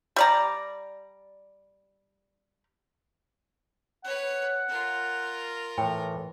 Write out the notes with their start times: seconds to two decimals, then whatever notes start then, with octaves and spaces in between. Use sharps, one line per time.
0.16 G3 D5 A#5
4.05 B4 C#5 F#5
4.68 F4 A#4
5.78 A2 E3 G5